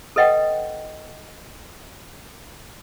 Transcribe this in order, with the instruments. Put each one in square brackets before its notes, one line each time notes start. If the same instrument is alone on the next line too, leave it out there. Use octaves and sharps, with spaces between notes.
[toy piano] A4 B4 D#5 F#5 G5